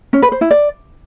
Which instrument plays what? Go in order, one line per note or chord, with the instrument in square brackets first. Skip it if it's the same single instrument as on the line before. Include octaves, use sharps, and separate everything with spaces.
[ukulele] C#4
B4
C5
E4
D5